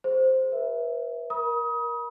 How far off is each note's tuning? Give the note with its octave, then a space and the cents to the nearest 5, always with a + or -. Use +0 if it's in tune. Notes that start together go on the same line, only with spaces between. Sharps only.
G#4 +0 C5 +0
B4 -45 E5 +0
A#4 +15 B5 -40 D#6 +25